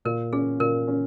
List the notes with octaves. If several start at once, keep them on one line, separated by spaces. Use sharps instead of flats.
A#2 A#4
C#4 G#4
A#2 A#4
C#4